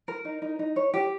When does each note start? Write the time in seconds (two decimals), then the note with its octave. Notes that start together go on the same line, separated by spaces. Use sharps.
0.08 A#4
0.25 D#4
0.42 D#4
0.59 D#4
0.76 C#5
0.94 G4